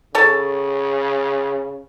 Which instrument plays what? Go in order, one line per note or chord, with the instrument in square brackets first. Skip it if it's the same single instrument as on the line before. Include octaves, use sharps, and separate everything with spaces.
[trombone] C#3 [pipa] A4 C#5 A5